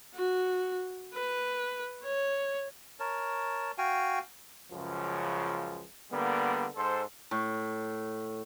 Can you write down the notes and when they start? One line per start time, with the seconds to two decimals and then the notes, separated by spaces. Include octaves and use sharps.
0.15 F#4
1.14 B4
2.04 C#5
3.00 A#4 C#5 A5
3.78 F#4 F5 G5 G#5
4.72 C#2 F#2 C#3 F3
6.12 D3 G3 A#3 B3
6.76 G#2 A4 C5
7.31 A2